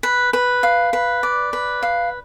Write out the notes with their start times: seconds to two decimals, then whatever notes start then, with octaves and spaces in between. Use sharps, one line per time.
0.03 B4
0.33 B4
0.63 F5
0.93 B4
1.23 D5
1.53 B4
1.83 F5